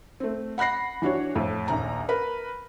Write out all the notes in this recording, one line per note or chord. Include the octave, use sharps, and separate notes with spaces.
A3 C4
F#5 B5 F#6 A#6 C7
E3 D4 F#4 C#5
F2 A2
A#1 D#2 A#5
A#4 B4 B5